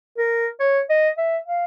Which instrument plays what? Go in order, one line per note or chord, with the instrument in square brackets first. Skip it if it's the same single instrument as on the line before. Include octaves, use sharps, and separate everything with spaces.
[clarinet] A#4
C#5
D#5
E5
F5